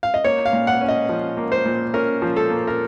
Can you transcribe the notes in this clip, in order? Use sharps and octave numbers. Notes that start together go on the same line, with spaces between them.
F5
D#5
A#3 C#5
F5
A#2
F#5
C#4
D#5
F3
A#3
C5
A#2
C#4 A#4
F3
A4
A#3
A#4